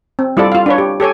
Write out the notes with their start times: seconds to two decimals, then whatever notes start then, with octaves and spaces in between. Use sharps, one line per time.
0.19 C4
0.37 G3 E4 F4 A4 D5
0.52 F4 F5
0.66 D4 B4 C#5
0.78 G4
1.00 G4 A4 C#5 G#5